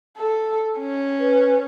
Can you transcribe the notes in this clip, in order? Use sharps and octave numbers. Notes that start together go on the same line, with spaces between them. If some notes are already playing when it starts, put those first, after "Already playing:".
A4
C#4
B4